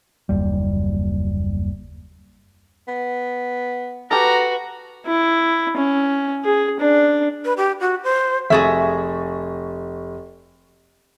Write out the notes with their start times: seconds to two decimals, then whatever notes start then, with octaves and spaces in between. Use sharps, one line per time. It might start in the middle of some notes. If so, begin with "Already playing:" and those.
0.29 F#1 D#2 G3
2.88 B3
4.11 F#4 G4 A4 B4 A#5
5.06 E4
5.77 C#4
6.44 G#4
6.80 D4
7.45 B4
7.58 G4
7.80 F#4
8.04 C5
8.50 F1 F#4 G#4 E5 C#6 A6